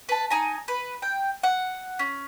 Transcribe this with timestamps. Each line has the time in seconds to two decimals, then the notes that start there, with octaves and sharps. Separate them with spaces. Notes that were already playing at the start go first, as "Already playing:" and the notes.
0.09 B4 A5
0.30 D#4 G#5 A#5
0.68 B4
1.02 G5
1.43 F#5
1.99 C#4